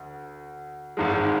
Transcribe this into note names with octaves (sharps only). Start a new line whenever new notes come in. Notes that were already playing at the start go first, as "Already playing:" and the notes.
Already playing: D2
G#1 G#2 G#3